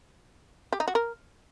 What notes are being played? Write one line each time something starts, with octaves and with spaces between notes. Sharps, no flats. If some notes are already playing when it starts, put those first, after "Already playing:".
G4
D#4
F#4
A#4